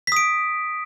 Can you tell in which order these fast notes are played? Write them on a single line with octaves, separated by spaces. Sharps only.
B6 D#6 D7